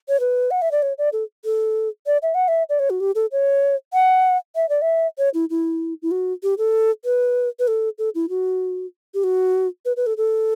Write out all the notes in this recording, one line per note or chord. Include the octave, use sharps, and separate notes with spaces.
C#5
B4
F#5
E5
D5
C#5
D5
A4
A4
D5
E5
F#5
E5
D5
C#5
F#4
G4
A4
C#5
F#5
E5
D5
E5
C#5
E4
E4
E4
F#4
G4
A4
B4
B4
A4
A4
E4
F#4
G4
F#4
B4
B4
A4
A4